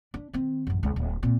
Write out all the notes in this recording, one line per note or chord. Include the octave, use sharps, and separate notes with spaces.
D4
D#3 C4
A1 F#2
C#2 C#4
D1
A#2 C4